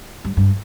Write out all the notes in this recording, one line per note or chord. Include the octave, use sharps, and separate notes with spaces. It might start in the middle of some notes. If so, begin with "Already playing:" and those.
G2
G2